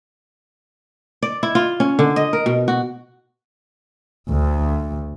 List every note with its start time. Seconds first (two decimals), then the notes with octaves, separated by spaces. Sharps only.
1.23 D5
1.43 E4
1.55 F4
1.80 C#4
1.99 D3
2.16 D#5
2.33 A#4
2.46 B2
2.68 F#4
4.30 D2